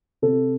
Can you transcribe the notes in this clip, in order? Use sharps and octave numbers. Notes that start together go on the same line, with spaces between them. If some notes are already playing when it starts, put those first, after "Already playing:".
C3 A4